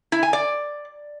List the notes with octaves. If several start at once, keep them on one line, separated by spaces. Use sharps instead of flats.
E4
G#5
D5